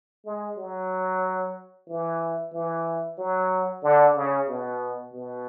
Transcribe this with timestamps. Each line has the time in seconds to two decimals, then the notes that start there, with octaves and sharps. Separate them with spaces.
0.25 G#3
0.57 F#3
1.88 E3
2.53 E3
3.18 F#3
3.83 D3
4.16 C#3
4.48 B2
5.13 B2